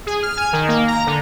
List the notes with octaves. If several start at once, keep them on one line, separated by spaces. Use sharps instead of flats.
G#4
F6
G#5
D#3
A#3
A#5
D3